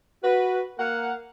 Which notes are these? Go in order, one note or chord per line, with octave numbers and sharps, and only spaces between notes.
F#4 B4
A#3 A#4 F5 F#5